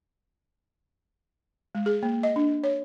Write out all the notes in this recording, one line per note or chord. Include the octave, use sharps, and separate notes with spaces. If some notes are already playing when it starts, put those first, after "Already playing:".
G#3
G#4
A#3
D#5
D4
C#5